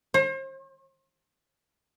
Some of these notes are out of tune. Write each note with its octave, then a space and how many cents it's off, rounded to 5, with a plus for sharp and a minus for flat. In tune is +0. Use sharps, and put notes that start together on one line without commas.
C5 +40